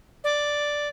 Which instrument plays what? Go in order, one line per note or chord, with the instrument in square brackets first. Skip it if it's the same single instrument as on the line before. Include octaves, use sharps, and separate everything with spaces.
[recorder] D5